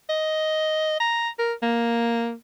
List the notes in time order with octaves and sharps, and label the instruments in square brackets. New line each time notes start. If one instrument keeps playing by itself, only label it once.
[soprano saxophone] D#5
A#5
A#4
A#3